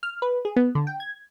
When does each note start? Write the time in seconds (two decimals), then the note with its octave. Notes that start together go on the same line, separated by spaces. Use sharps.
0.03 F6
0.22 B4
0.45 G#4
0.56 B3
0.75 D3
0.87 G5
1.00 G#6